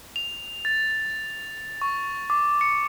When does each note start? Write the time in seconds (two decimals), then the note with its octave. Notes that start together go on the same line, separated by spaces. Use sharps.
0.16 F7
0.65 A6
1.82 C#6
2.30 D6
2.61 C#7